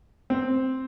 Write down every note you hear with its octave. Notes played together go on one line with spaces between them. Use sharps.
C4